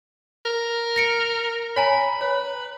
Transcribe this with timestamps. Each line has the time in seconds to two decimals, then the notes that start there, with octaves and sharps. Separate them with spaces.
0.45 A#4
0.96 A#6 C#7 D7
1.76 C#5 G#5 A#5 B5
2.21 B4 C#5